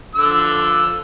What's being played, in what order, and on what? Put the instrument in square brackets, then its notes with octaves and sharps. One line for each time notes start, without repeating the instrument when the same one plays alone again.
[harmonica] D3 F3 E6